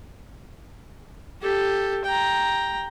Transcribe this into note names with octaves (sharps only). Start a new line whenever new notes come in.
G4 A4
G5 A#5